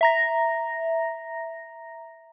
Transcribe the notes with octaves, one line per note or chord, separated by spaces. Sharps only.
E5 A#5 A#6